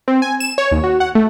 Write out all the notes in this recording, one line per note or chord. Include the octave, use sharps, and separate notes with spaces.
C4
G#5
E7
C#5
D#2
F#4
F#5
A3